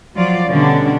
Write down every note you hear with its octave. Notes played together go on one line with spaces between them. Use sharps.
F3 F#3 F4 D5
B2 D3 G3 C#4 D4